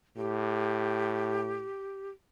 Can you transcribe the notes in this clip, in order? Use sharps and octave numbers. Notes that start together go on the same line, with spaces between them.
A2 G4